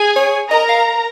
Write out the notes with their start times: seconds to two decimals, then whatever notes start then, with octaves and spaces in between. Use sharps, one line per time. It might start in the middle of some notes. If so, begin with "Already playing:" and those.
Already playing: G#4 G#5
0.16 C#5
0.50 A#4 D#5 A#5
0.69 F5